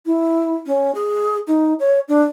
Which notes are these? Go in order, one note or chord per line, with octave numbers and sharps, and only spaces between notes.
E4
C#4
G#4
D#4
C#5
D4